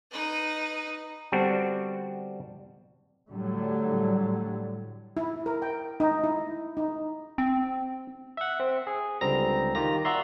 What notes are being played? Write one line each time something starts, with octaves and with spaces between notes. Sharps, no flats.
D#4 B4
D3 G3 B3 C4 D4 F#4
A2 D3 F#3 G3
E4
A#4
G5
D#4
E4
D#4
C4
E5 F#5
C4
G#4
C#2 D3 G3 C4 A#5 A#6
D#3 A#3 F4 G4 A#5 A#6
F#4 D5 E5 A#5 C6